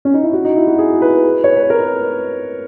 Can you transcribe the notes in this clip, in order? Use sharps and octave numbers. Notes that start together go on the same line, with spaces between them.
C#4
D#4
E4
F#4
D#4
E4
F#4
G#4
B4
C#5
B4
A#4